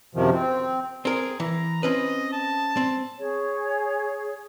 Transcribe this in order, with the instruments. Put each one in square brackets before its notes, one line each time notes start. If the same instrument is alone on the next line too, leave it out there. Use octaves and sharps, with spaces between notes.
[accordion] F#2 C3 D#3 F3
C4
[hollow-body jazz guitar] C4 A#4 [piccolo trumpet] G#4
[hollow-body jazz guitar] E3 [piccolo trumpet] A#5
[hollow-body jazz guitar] C4 C#4 B4 [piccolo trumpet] D#5
[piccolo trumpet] A5
[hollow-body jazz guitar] C4
[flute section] G#4 C#5